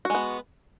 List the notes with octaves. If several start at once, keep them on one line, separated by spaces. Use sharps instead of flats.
G#3 B3 F#4